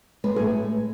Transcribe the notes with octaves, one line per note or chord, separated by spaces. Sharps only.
G#3 B4
G#4
A2